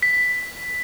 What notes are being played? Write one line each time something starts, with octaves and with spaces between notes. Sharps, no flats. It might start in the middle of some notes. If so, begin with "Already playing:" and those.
B6